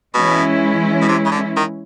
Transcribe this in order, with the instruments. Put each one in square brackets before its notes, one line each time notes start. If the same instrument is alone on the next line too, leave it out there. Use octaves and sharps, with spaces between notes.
[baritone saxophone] B2 [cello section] E3 G#3 C#4 E4
[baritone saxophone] B2
C3
C#3
D3
D#3